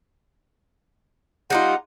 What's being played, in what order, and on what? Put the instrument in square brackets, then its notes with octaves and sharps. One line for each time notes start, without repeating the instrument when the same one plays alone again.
[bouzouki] G3 D#4 F4 [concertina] F#5